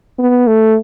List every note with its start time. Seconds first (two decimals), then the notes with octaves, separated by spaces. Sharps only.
0.19 B3
0.47 A3